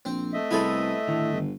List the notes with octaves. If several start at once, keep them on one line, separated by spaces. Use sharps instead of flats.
A#1 C4
A3 D#5 E5
C2 B3 E4 G#4 A4 C5 B5
A2 D3 D#3
G1